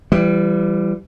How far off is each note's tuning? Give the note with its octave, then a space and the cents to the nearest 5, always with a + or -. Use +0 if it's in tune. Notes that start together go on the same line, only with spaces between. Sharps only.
E3 +35 G3 +0